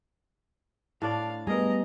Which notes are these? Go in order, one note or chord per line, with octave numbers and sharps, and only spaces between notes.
A2 D4 D5 F5
G3 A3 B3 G#4 A#4 B4 D#5 A#5